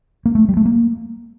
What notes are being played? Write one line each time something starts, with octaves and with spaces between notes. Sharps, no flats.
A#3
A3
G3
A3
A#3